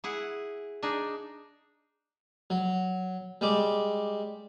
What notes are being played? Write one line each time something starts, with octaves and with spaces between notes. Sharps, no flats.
E4 G#4 F#5
D4 D#4 G#4
F#3
G3 G#3 D6